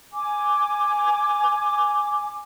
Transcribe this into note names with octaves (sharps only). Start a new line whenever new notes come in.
G#5 D6